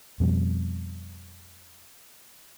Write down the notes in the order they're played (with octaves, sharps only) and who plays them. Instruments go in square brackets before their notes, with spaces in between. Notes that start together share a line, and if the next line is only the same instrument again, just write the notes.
[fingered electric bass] F2 B2 G3